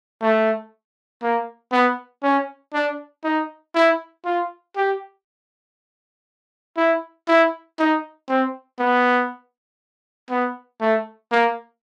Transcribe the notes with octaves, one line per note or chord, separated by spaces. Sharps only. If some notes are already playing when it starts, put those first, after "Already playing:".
A3
A#3
B3
C#4
D4
D#4
E4
F4
G4
E4
E4
D#4
C4
B3
B3
A3
A#3